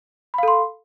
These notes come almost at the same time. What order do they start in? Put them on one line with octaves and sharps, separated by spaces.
B5 F5 A4 C6